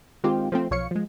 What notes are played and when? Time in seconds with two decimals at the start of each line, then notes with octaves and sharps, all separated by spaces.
0.24 D#3 G#3 C4 F4 G4
0.52 F3 A3 C4
0.71 B1 F3 C#5 F5 C#7
0.91 F3 G#3